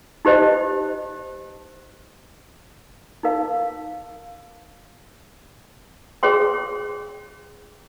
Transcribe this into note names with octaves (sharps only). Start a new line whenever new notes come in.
D#4 G4 C5 D#5
D#4 A#4 F5
G#4 C#5 G5 C6